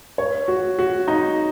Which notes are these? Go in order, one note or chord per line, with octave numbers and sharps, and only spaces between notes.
C#5
F#4
F#4
D#4